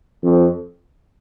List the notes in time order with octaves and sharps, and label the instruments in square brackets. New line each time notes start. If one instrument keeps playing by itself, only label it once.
[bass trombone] F2